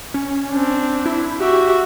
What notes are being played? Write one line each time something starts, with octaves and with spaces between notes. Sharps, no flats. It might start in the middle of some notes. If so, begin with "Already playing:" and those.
C#4
C4 D4
E4
F#4 G4 E5